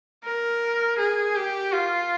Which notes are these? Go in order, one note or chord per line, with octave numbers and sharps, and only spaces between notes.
A#4
G#4
G4
F4